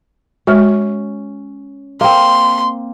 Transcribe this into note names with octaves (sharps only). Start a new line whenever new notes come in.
G#3 C#4 F#4
A#3 C4 C6